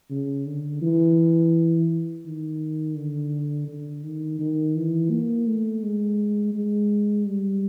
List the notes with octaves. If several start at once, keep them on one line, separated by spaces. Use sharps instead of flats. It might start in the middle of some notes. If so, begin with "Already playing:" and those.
C#3
D3
E3
D#3
D3
D3
D#3
D#3
E3
A#3
A3
G#3
G#3
G3